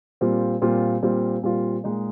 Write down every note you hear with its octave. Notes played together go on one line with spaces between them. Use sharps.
A#2 G3 C4 F4
A#2 G3 C4 F4
A#2 G3 C4 F4
A#2 G3 C4 F4
A#2 G#3 D#4